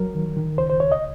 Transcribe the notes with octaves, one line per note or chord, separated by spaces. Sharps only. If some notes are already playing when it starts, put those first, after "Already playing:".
Already playing: F#3 A#4
D#3
D#3
C#2 C5
C5
C#2 C#5
D#5